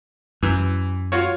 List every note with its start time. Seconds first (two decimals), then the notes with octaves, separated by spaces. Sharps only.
0.43 F#2 E3
1.12 F4 F#4 C#5